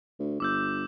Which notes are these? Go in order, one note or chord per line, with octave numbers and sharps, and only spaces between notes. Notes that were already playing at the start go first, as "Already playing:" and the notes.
D2
G1 D6 E6 G6